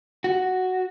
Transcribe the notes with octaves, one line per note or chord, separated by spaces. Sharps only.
F#4